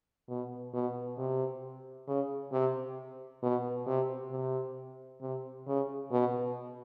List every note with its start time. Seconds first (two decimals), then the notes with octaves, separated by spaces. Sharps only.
0.29 B2
0.74 B2
1.18 C3
2.08 C#3
2.52 C3
3.43 B2
3.87 C3
4.32 C3
5.22 C3
5.67 C#3
6.12 B2